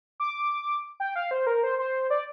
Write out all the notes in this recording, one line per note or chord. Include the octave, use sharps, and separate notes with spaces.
D6
G5
F5
C5
A#4
C5
C5
D5